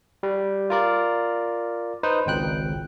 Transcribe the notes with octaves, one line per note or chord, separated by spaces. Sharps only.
G3
F4 A#4 D5
D#4 B4 C5
G#1 C#2 G5 F#6